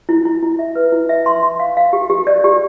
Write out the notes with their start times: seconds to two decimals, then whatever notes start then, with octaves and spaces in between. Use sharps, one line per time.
0.09 E4
0.26 E4
0.43 E4
0.59 E5
0.75 B4
0.92 E4
1.09 E5
1.26 C6
1.43 C6
1.59 F5
1.77 F5
1.93 G4
2.10 G4
2.27 D5
2.44 G4